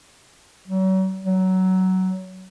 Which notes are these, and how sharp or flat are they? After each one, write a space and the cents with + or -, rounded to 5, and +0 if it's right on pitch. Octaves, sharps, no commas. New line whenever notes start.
F#3 +40
F#3 +15